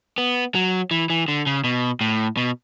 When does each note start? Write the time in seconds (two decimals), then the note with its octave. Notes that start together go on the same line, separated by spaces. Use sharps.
0.18 B3
0.55 F#3
0.91 E3
1.10 E3
1.28 D3
1.47 C#3
1.64 B2
2.01 A2
2.37 B2